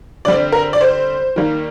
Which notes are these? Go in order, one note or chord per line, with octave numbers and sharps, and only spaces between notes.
D3 G3 C4 D5
A#4
D5
C5
D#3 G3 A#3